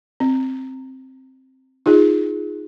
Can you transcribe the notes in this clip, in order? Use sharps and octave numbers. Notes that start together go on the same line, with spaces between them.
C4
D#4 F4 G#4